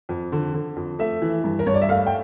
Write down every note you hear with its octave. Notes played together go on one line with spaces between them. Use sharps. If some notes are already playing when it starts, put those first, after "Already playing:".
F2
D3
D3
F2
A3 E5
E3
G2
A#4
G2 C#5
D5
E5
A3 F5
G5